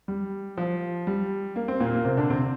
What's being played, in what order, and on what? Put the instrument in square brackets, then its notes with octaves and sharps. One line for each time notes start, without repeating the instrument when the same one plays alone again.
[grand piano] G3
F3
G3
A#3
C4
A#2 A#3
A#3
C3 C4
D3 D4
C3 C4